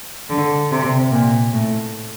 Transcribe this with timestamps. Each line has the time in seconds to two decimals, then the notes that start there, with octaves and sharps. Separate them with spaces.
0.30 D3
0.71 C3
1.11 A#2
1.53 A2